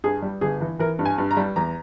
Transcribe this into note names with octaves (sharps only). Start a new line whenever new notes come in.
G2 G#4
G3
G1 G#4
E3
E3 A#4
G2
G#5
G2
A#5
G3
E2 A#5